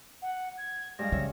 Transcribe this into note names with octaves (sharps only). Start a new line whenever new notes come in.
F#5
G#6
G2 G#3 F5 A#6
C#3 C#5 E5